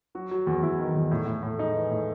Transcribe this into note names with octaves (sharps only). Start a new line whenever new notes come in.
F#3 F#4
F#3
E2
E2 E4
D#3
E2
A2
A2
A2
G#3 D#4
E3
A2